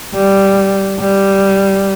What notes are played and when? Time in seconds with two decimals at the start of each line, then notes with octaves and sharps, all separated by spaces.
0.14 G3
1.00 G3